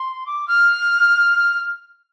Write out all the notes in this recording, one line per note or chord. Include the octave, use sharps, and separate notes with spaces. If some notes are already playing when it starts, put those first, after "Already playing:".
Already playing: C6
D6
F6